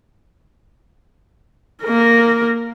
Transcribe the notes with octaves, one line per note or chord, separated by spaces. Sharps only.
A#3 A#4